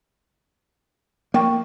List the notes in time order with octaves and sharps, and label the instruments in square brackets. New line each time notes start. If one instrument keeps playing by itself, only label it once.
[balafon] F3 G5 C#6 [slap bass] A#3